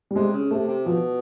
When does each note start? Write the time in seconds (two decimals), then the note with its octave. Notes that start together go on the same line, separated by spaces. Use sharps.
0.11 G3
0.16 C3 G#3
0.33 C#3
0.51 C3 A3
0.68 C3
0.85 B2 F3